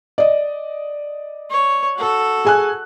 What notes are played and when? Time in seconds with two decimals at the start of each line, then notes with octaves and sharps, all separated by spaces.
0.18 D5 D#5
1.50 C#5
1.96 F#4 A4
2.45 G#4 G#5 F#6